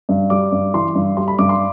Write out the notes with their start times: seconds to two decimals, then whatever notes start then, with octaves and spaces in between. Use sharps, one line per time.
0.09 G2
0.30 G3 D6
0.52 G2
0.74 E3 C6
0.95 G2
1.17 G3 C6
1.28 B5
1.38 G2 D6
1.49 C6